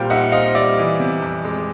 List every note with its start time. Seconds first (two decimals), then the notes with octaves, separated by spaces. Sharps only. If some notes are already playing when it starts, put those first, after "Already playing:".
Already playing: A#2 G3 C4 F5 G5
0.10 D#4 E5 F#5
0.32 C4 D#5 F5
0.55 G3 D5 E5
0.78 E3
1.00 C3
1.22 F2
1.45 G#3